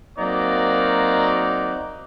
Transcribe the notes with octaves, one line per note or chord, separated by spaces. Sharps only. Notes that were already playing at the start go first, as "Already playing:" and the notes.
F#3 A#3 C4 D#4 F#4 D5